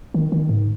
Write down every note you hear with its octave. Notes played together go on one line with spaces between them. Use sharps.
D#3
D#3
G#2